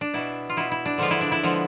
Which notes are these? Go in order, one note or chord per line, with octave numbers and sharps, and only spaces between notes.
D4
B2 B3 E4
F4
B2 B3 E4
E4
D4
D3 F3 G#3 B3 F4
E4
D4
E4
D3 F3 G#3 B3